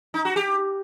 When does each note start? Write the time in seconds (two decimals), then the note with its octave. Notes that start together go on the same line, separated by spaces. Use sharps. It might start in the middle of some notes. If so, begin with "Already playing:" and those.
0.14 D#4
0.25 F#4
0.36 G4